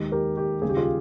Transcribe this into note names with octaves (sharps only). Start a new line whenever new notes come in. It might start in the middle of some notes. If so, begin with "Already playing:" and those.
Already playing: D#2 D#3 G#3 G4
G4 A#4
G4
D#2 C#3 G3 G#4
G4
F4 G#4